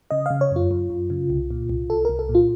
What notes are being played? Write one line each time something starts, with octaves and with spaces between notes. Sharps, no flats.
C#3 D#5
C#3 F5
C#5
F#2 F4
F#2
F#2
C#3
C2
A#2
C2
C2 A4
C2 A#4
A4
A#2
F4